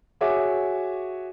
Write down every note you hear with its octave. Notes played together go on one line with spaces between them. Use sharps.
F#4 G#4 C#5 E5 G#5 D6